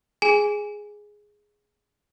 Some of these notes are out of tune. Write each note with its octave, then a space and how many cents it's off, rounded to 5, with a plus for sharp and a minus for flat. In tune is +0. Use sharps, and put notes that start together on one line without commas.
G#4 +0 G#5 -10